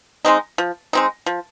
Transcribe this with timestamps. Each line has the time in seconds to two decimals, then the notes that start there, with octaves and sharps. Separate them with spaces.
0.25 G#3 C4 D#4
0.58 F3
0.93 G#3 C4 D#4
1.26 F3